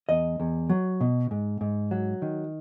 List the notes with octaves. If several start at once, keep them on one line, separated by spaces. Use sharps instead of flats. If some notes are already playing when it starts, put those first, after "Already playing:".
E2 D#5
E2
F#3
B2
G#2
G#2
F#3
D#3